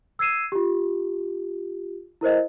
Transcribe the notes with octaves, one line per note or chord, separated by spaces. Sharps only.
E6 G#6 C7 D#7 E7
F4 G4
E4 A#4 C5 D#5